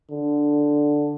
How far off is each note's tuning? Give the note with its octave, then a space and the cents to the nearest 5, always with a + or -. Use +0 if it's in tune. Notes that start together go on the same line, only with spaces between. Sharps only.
D3 +0